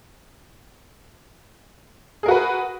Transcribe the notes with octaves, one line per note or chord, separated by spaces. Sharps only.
F#4 G#4 A#4 B4